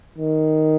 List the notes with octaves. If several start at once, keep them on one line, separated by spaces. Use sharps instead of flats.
D#3